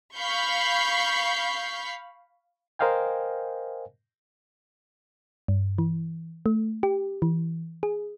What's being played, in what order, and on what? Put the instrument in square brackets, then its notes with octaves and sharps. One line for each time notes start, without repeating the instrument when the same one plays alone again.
[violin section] F5 B5 C#6 G6 C7
[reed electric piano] A#4 C5 D#5 F5 G5 G#5
[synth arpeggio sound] G2
E3
A3
G4
E3
G#4